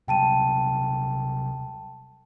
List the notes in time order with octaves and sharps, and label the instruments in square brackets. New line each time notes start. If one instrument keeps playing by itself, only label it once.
[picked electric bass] C3 F#3 G3 [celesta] G5 A5 D#7